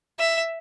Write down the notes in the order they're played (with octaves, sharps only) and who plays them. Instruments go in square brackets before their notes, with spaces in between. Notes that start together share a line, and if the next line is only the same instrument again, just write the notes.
[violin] E5